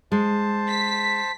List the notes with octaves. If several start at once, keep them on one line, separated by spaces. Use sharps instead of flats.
G#3 C5 A5
B6